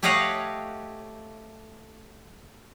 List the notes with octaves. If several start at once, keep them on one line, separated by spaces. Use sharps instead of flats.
A3 G4 C#5 D#5 F5 F#5